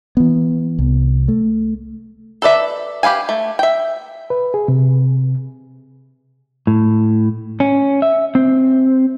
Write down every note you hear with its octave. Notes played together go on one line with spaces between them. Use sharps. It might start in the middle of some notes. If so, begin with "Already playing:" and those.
E3 B3
C2
A3
A4 B4 D5 E5
G4 B4 F5 G#5
A3
E5 G5
B4
G#4
C3
A2
C#4
E5
C4